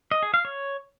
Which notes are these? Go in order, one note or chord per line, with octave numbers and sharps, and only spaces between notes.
D#5
G#4
F5
C#5